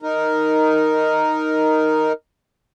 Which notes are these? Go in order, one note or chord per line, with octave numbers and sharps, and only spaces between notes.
D#4 A#4